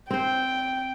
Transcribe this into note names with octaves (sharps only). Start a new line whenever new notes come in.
C4 C5 G5